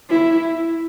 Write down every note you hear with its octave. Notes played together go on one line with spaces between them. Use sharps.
E4